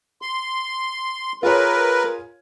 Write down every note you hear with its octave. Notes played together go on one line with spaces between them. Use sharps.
C6
F4 G#4 A#4 B4 C#5